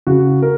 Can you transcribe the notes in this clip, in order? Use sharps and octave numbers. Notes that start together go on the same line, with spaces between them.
C#3 F#4
A#4